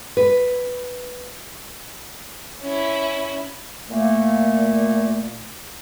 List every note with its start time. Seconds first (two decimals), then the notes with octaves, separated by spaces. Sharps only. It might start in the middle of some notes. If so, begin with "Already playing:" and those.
0.17 B4
2.62 C#4 E4
3.90 A#2 A3 A#3